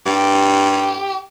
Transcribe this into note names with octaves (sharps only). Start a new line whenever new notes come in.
G2 G4